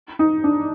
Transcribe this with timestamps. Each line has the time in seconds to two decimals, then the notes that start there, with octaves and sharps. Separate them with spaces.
0.19 D#4
0.44 D4